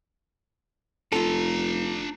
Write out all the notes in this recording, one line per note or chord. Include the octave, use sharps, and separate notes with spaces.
F1 D4 F4 A4 A#5